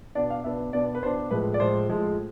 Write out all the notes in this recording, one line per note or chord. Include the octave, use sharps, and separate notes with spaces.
B2 B3 D4 D5
F5
B2 B3 D4 E5
B2 B3 D4 D5
B4
B2 B3 D4 C5
A2 F3 G#3 B4
D5
A2 F3 G#3 C5
A2 F3 G#3